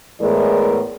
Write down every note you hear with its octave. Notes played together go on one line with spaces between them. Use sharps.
E2 A2 E3 G#3 A#4 D5